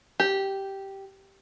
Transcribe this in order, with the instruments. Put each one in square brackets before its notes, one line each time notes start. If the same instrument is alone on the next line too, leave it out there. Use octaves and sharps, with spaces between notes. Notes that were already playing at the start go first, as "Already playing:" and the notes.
[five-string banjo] G4